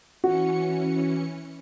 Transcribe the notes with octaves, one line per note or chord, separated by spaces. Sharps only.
E3 C#4 F#4 C#7